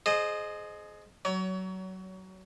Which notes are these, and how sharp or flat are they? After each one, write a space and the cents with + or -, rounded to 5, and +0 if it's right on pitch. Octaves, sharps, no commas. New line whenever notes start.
G#4 +25 C5 +0 D#5 -20
F#3 +20 C#5 +35